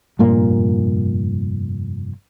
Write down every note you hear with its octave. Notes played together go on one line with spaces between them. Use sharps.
F1 G2 A#2 A#3